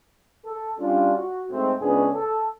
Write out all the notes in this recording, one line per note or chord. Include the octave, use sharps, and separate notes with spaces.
A4
G3 C#4 D4 F4
F#4
G#2 A3 C4
C#2 B3 C#4 D4 G#4
A4